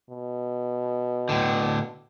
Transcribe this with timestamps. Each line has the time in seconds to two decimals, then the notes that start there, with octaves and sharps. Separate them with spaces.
0.10 B2
1.29 A2 D3